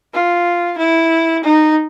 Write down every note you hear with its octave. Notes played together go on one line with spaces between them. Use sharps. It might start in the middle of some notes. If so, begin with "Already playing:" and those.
F4
E4
D#4